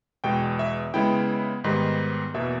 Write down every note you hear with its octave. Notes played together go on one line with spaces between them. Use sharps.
E2 B2 G#3 G5
E5
C#3 G#3 B3 E4 G5
G#2 D#3 G3 B3
E2 B2 A#3 E5